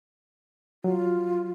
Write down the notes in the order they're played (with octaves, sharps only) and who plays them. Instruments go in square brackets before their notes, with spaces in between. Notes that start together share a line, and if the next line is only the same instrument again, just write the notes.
[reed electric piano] F#3 [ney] F4